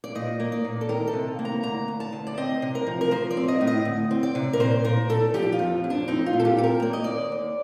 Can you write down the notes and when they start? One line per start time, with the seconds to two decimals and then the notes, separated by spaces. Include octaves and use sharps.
0.04 D5
0.15 A#2 D#5
0.40 A#3
0.52 D5
0.65 A#2
0.81 A4
0.89 D#3 A#4
1.07 A4
1.13 C3
1.39 A#3
1.45 A#5
1.63 D2 A#5
1.88 D2
2.00 A5
2.13 D2
2.27 D5
2.37 C4 D#5
2.62 C3
2.75 A#4
2.87 F3
3.01 A#4
3.11 F3 C5
3.31 D5
3.37 C4
3.48 D#5
3.61 A2
3.67 D#5
3.85 D2
4.11 C4
4.23 D5
4.35 C3
4.53 A#4
4.60 A#2 C5
4.84 A#2 A#4
5.09 A#2 A4
5.34 F3 G4
5.52 F4
5.59 F2
5.84 F2
5.90 D4
6.08 C4 D#4
6.26 F4
6.33 A#2
6.40 A4
6.45 G4
6.57 C4 A4
6.64 A#4
6.82 A#3 D5
6.93 D#5
7.04 D#2 D5
7.32 D#2